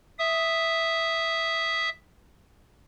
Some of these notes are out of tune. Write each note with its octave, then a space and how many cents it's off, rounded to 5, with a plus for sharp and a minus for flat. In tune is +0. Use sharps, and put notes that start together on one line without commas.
E5 +0 D#6 +0